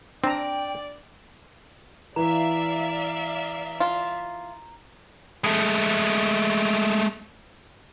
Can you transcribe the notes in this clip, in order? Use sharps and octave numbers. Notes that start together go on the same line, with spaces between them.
C4 D4 D5 G5 A#5
E3 D5 E5 F5 A#5
F4
G#3 A3